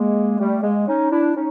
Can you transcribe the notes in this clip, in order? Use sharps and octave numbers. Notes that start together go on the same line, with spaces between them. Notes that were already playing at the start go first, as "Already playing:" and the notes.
Already playing: G#3 A#3
G3 A3
G#3 A#3
C#4 D#4
D4 E4
C#4 D#4